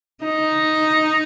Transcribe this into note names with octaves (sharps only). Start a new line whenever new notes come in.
D#4